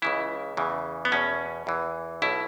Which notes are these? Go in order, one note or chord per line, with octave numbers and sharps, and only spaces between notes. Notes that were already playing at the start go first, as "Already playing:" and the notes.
C#2 C#3 E3 E4
E2 C#3 E3
B3
E2 B2 C#4
E2 E3
B1 B2 E4